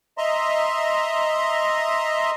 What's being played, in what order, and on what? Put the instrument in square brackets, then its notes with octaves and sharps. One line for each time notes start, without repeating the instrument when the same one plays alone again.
[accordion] D#5 E5 A#5 C6